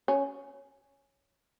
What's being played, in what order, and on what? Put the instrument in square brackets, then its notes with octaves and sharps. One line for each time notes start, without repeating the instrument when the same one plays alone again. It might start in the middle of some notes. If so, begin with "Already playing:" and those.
[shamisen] C#4